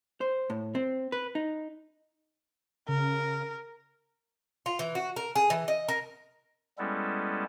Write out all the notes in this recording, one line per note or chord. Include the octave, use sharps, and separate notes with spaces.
C5
A2
C4
B4
D#4
C#3 A#4
F4
E3
F#4
A#4
G#4
E3
D#5
A#4
G3 G#3 B3 C#4 E4 A4